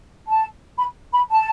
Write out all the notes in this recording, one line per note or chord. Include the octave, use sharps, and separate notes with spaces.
A5
B5
B5
A5